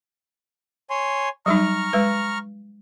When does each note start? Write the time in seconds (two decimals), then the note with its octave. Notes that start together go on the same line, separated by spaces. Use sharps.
0.90 C#5 G#5 C6
1.46 F#3 G3 D#4 A#5 C#6 F6
1.93 G#3 B4